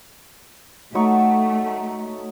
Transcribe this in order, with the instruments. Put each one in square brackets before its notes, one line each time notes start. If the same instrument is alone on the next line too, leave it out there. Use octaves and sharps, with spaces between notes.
[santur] F#3 D#4 C#6 [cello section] A3